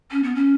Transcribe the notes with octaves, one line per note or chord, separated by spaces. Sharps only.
C#4
B3
C#4